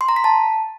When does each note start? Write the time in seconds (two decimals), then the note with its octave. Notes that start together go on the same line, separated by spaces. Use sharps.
0.01 C6
0.09 A#5
0.16 B6
0.24 A5